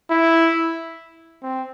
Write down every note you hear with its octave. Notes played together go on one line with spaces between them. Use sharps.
E4
C4